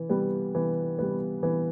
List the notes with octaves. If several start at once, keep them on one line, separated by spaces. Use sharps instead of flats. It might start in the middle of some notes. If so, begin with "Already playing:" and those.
Already playing: E3
G3 B3
E3
G3 B3
E3